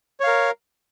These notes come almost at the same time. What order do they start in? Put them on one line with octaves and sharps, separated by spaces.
C#5 F5 A#4